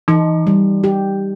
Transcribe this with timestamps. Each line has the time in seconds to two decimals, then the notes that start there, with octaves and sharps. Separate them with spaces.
0.08 E3 D#4
0.47 G3
0.84 G4